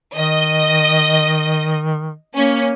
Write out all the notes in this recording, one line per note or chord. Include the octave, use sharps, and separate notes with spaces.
D#3 D#5
A#3 C#4